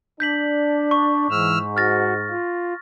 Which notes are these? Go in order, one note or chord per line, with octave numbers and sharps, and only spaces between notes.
D4 D5 G6 B6 F#7
C#6
G#2 E3 E6 F6
F#4 F6 A6 A#6
F4